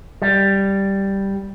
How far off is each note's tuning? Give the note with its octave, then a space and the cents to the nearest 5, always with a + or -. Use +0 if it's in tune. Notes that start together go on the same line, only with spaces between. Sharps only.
G3 +0